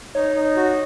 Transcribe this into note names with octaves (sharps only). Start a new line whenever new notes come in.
D#4 C#5
D#4
F#4